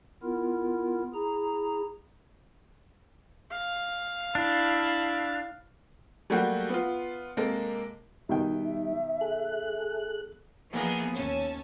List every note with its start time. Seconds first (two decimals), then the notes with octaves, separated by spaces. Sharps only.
0.23 B3 E4 F4 A#4
1.14 E4 G#4 A#5
3.51 F5
4.35 D4 E4
6.30 F#3 G3 A3 A#3 F#4 G4
6.69 B3 F4
7.37 C3 G#3 A#3 A4 A#4
8.29 B2 D#3 G3 D#4 E5 G5
9.21 G#4 A4 F#6
10.72 E3 F3 A#3 B3 D#4 G#4
11.14 D#2 C#4 A5